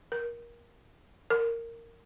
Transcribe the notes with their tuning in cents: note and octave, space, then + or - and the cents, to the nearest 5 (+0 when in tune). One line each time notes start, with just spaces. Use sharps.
A#4 +20
A#4 -15